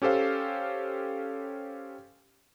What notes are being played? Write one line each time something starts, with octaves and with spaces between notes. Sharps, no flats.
C#4 G4 A4 C5 F5